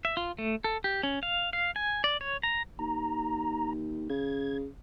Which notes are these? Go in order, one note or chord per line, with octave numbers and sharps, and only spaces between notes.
E5
F4
A3
A4
G4
C#4
F5
F5
G#5
D5
C#5
A#5
D#2 A#5
C#3 G#6